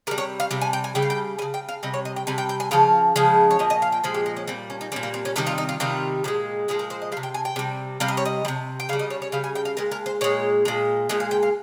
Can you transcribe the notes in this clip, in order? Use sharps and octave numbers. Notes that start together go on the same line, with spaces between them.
C3 G3 A#4
C#5
F5
C3 G3
G#5
G5
G#5
C#3 G3 G5
F5
G5
G3 G#5
C#3
G5
F5
C3 G3 D#5
C#5
D#5
G5
C3 G3 G#5
G5
G5
G#5
C#3 F3 F5
C#3 F3 G#3
C#5
A#2 F3 D#5
D#5
F5
G5
A#2 F3 G#3 G#4
G4
D#4
C#4
A#2 G3 C4
C#4
D#4
A#2 G3 C#4
A#3
C4
C#4
C3 D#3 G3 D#4
F4
D#4
F4
C3 D#3 G3 F4
A#2 F3 G#3
A#2 F3 G#3 G#4
A#4
C5
D#5
G3 F5
C3
G5
G#5
G5
C3 G3
C3 G3 F5
D#5
C#5
D#5
G3
C3
G5
C#3 G3 F5
D#5
C#5
C#5
C#3 G3 F5
G#5
G5
F5
A#2 G#3 A#4
A#4
C5
A#2 G#3 C#5
A#2 G#3
A#2 G#3 D#5
F5
G5
F5